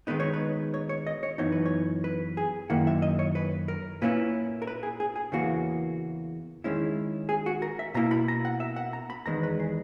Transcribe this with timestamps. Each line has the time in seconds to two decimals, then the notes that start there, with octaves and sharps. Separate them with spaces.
0.07 D#3 G#3 B3 D#4 B4
0.20 C#5
0.33 B4
0.74 C#5
0.89 C#5
1.07 D#5
1.23 C#5
1.38 F#2 E3 B3 D#4 C#5
1.52 B4
1.66 C#5
2.04 B4
2.37 G#4
2.70 F#2 D#3 A#3 E4 F#5
2.87 E5
3.02 D#5
3.19 C#5
3.35 B4
3.68 A#4
4.01 A#2 A#3 C#4 E4 B4
4.62 A#4
4.67 B4
4.83 G#4
5.00 G#4
5.16 G#4
5.32 E2 C#3 E3 A#3 F#4
6.64 D#3 G#3 C#4 E4
7.29 G#4
7.46 F#4
7.62 A#4
7.79 E5
7.94 B2 A#3 E4 A#5
8.11 B5
8.28 A#5
8.45 F#5
8.60 E5
8.76 F#5
8.93 A#5
9.10 B5
9.26 E2 D#3 G#3 A#5
9.43 B4
9.60 G#4